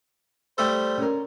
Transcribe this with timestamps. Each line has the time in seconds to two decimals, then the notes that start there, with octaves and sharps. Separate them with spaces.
0.58 G3 A3 A4 C5
0.98 C#4 A#4